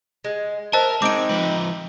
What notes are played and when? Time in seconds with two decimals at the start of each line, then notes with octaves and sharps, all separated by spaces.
0.24 G#3
0.73 A#4 C5 D#5 E5 A5
1.02 G#3 C4 D#4 D6 D7
1.29 F3 B4